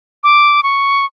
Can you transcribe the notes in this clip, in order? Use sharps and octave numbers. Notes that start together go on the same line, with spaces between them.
D6
C#6